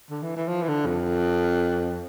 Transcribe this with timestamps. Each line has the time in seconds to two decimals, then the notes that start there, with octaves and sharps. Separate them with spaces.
0.10 D3
0.23 E3
0.37 E3
0.48 F3
0.62 E3
0.68 D3
0.86 F2